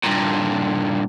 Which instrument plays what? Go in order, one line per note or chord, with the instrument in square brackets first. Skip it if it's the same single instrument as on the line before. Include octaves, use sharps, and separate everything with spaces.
[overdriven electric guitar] G2 A#2